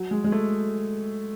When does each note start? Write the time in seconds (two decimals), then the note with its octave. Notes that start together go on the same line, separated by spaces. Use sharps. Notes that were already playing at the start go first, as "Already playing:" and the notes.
Already playing: F#3
0.11 G#3
0.24 G#3
0.32 A3